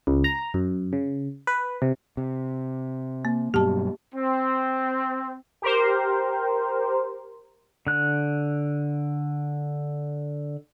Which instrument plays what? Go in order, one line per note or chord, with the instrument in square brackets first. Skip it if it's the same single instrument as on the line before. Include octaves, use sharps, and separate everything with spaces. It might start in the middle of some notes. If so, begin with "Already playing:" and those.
[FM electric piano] C#2
A#5
F#2
C#3
B4
C3
[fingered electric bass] C3
[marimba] A#3
[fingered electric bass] G2 B2 F#3 [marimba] G4 A5
[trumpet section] C4
[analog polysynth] G4 A#4 C5
[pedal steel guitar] D3 F#6